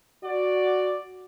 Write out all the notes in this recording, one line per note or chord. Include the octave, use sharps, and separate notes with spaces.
F#4 D5